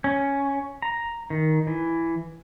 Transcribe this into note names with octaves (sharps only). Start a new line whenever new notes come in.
C#4
A#5
D#3
E3